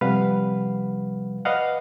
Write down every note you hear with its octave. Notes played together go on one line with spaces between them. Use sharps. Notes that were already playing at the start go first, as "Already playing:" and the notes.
C3 F3 G3 B4 F5 F#5
B4 D5 D#5 F5 F#5